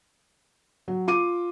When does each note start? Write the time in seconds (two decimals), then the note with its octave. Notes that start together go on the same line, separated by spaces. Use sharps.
0.88 F#3
1.08 F4 D6 D#7